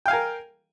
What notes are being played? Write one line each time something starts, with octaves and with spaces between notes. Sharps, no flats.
A#4 F5 G5 G#5